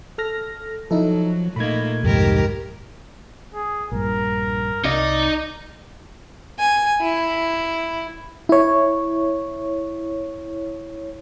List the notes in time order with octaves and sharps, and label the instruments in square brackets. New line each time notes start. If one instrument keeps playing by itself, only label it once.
[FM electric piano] A4 F6 A#6
[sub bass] F3 [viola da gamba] F#3 [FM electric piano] D#4 E4 A4
[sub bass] A#2 [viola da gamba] A3 A#3 D#4 [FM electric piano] B5 G#6
[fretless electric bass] C2 F2 G#2 [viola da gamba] D#3 G4 A#4
[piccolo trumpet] G#4
[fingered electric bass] A#1 G2 [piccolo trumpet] A#4
[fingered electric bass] C2 [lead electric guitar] D#4 D#5 [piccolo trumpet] D5
[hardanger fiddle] G#5
E4
[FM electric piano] E4 C#5